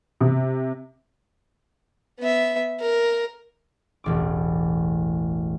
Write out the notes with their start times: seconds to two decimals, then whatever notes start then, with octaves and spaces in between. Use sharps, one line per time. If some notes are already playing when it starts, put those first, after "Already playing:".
0.21 C3
2.19 B3 E5
2.81 A#4
4.04 E1 A1 D6